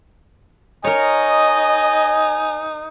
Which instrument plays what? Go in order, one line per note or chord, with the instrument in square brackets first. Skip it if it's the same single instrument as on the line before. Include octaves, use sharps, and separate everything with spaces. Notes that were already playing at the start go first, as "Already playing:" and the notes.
[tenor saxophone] D#4 [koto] A#4 C#5 [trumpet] D#5 [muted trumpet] G#5